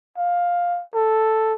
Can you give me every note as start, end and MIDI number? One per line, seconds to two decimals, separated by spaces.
0.18 0.82 77
0.95 1.54 69